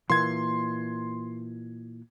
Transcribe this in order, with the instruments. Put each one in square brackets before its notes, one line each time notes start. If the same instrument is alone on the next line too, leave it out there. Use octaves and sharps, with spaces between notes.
[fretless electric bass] A#2 E3 A#3 [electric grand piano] C6 G#6